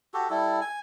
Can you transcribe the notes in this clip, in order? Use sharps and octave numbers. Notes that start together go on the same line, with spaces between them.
F#4 G4 A4
G3 E4 A4
G#5